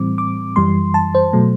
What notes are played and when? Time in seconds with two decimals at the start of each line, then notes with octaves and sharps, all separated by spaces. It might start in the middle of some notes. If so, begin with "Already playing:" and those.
Already playing: A2 E3 G3 C4 D6
0.18 D6
0.56 F#2 E3 G3 C6
0.94 A5
1.15 C5
1.33 B2 F#3 A3